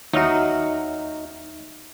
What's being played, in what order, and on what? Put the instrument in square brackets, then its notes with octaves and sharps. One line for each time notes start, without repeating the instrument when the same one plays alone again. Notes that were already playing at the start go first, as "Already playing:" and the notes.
[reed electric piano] D#2 E5 F6 [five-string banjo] F#3 F#4 [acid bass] D#4